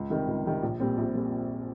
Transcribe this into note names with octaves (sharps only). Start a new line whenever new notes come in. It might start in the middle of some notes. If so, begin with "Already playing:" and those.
Already playing: C#2
C3 D#3 G3
C#2
C3 D#3 G3
A#1
A#2 G3 C4
A#1
A#2 G3 C4